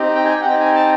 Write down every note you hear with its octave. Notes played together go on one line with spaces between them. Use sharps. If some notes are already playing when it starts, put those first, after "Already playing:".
Already playing: C4 D#4 G4
G5
G#5
G5
F#5
C4 D#4 G4 G5
G#5
A5